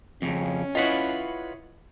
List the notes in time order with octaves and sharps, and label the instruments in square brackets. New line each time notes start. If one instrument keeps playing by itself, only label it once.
[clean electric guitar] F2 C#3 [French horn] C#4
[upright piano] E4 C#5 D#5 [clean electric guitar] F4 B4 F#5